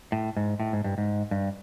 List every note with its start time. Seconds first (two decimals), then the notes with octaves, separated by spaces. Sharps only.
0.12 A2
0.37 G#2
0.60 A2
0.73 G#2
0.84 G2
0.98 G#2
1.31 G2